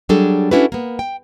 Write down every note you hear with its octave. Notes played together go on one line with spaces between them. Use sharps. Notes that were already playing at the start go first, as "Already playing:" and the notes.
F#3 G3 D4 G#4 A4
C#4 D4 E4 F#4 A4 B4
A#3 B3
G5